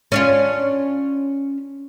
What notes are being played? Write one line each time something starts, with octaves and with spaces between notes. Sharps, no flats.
C#4 D4 F4